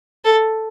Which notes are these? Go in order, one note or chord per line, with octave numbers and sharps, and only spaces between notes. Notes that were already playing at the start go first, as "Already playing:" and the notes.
A4